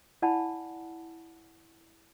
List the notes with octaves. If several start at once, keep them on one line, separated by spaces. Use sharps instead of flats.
E4 D5 F#5 G#5 A5 B5